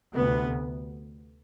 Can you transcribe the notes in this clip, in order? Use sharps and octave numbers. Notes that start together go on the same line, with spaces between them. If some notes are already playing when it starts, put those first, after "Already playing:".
D2 C3 B3